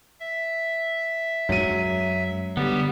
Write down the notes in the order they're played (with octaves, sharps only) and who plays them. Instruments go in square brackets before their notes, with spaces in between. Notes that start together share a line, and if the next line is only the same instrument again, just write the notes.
[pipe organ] E5
[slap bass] F#2 G#3 [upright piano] F#3 D#7
[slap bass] D3 [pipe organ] G3 G4 [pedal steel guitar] B3